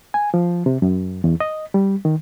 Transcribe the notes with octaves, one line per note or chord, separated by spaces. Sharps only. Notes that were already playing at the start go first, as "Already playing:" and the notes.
G#5
F3
C3
F#2
E2
D#5
G3
D#3